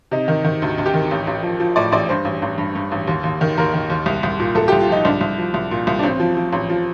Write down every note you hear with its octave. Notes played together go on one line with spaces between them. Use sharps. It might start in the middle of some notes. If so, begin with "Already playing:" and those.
C3 D#4
D#3
D#3
D2
D2
G4
D#3
A1
A1
F3
F3
A2 D5
A1 D5
G2 C5
A1
A1
G2
G2
A1
D#2
D#2
D#3
D#2 A#4
D#3
D#2
C2
C2
A#2
C2 A4
C2 G4
F4
F3 D#4
C2 D4
C2
F3
C2
A#2
C2
D4
A1 C4
F3
F3
A1
F3